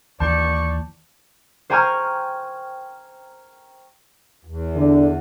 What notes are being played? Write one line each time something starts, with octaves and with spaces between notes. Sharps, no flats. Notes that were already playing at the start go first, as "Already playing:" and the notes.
D#2 E3 D5 A5 C#6 G6
C5 G5 G#5 A#5 C#6 F6
E2
D3